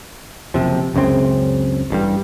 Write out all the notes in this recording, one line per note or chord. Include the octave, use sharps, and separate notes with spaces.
F#1 C2 C3 F3
C#2 F#2 C#3 C4
A1 G2 G3